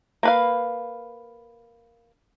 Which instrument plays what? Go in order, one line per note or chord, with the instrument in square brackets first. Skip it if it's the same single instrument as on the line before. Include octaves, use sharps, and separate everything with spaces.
[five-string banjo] A#3 B4 F5